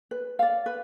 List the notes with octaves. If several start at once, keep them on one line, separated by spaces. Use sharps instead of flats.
B4
D5 F5
B4